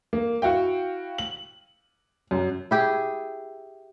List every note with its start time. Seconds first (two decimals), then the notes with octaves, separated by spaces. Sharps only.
0.13 A#3
0.42 E4 F#4 F5 G5
1.18 F#7
2.31 F#2
2.71 E4 G4 G#4